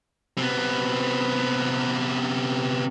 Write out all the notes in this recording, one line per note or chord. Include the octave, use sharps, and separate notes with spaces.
C3 B3